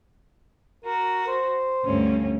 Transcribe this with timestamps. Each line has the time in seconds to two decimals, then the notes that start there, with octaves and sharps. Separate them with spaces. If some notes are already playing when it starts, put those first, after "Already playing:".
0.85 F#4 A#4
1.28 C5
1.84 D2 G2 C#4